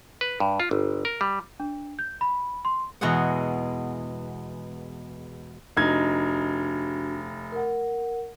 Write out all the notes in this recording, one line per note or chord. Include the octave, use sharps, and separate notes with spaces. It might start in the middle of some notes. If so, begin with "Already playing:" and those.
B4
G2
F4
G1
A#4
G3
D4
G6
B5
C6
E2 B2 G#3 G#4 F#5
F1 D4 D#4 F#4 G#6
A#4 F#5